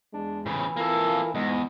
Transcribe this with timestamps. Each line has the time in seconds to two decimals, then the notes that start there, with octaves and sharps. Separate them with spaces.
0.14 E2 G#3 D4
0.46 A2 C#3 E3
0.76 A#3 E4 F4 A4 A#4
1.35 E2 G#2 G#3